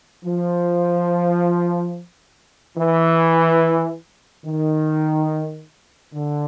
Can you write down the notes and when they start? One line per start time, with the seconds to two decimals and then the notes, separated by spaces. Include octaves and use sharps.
0.24 F3
2.78 E3
4.45 D#3
6.14 D3